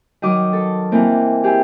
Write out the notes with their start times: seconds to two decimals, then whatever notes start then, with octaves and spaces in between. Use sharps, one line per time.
0.22 D#3 F#3 D#5 D6
0.53 A4
0.92 E3 A#3 C4
1.43 E4 G4 G#4